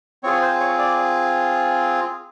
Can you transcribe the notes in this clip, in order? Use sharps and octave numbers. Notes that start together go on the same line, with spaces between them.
C4 F4 G#4 C#5
C5
C#5
D5